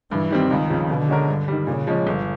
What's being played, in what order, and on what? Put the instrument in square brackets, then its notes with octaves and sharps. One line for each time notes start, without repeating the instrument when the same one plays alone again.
[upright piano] G2 [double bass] E3
[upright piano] D#3 G3 C4
[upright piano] C#2 [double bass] D#3
[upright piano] C#3 F3
[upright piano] B2 [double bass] D3
[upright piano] G#3 C#4 F#4 A#4
G2
D#3 G3
[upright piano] A#2 [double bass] C#3
[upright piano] F3 G#3 C#4
G1